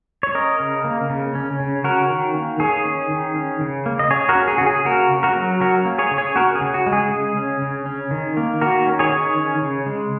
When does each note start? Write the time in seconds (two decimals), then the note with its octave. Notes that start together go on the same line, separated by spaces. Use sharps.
0.23 C#5
0.35 C#4 A#4 D#5
0.60 C#3
0.85 A#3
1.10 C#3
1.35 C#4
1.60 C#3
1.84 C#4 F#4 A#4
2.10 D#3
2.35 A#3
2.60 D#3 G#4 C#5
2.85 C#4
3.11 D#3
3.36 C#4
3.61 C#3
3.86 A#3
3.99 D#5
4.10 C#3 G#4 C#5
4.29 F#4 A#4
4.35 C#4
4.48 G#4
4.58 C#3 F#4
4.66 G#4
4.85 A#3 F#4 A#4
5.11 C#3
5.23 F#4 A#4
5.36 F#3
5.61 C#4 F#4 A#4
5.85 A#3
5.98 G#4 C#5
6.11 C#3
6.18 G#4 C#5
6.36 C#4 F#4 A#4
6.55 G#4
6.61 C#3
6.74 F#4
6.87 G#3
6.93 G#4
7.11 C#3
7.37 C#4
7.62 C#3
7.86 C#4
8.11 D#3
8.37 A#3
8.61 D#3 F#4 A#4
8.87 C#4
8.99 G#4 C#5
9.12 D#3
9.37 C#4
9.62 C#3
9.86 G#3